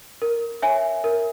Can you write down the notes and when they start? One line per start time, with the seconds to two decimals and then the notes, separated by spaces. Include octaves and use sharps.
0.22 A#4
0.62 C#5 E5 G#5
1.04 A#4